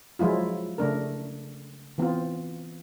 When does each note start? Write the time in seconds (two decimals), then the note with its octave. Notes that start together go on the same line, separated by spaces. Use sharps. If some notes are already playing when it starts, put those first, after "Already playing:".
0.19 F3 F#3 G#3 E4 F4
0.78 C#3 A3 D4 A#4
1.98 E3 B3 C4 F4